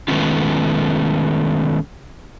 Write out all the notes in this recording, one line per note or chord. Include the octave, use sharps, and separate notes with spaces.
D#3 G#3 A3 B3 C#4 F4